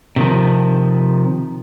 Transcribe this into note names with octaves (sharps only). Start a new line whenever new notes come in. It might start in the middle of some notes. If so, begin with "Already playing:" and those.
C3 D#3 F3